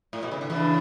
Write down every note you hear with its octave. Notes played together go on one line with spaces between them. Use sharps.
A2
B2
C#3
D3
C#3 E3 D4